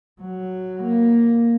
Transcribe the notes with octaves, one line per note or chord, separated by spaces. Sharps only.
F#3
A#3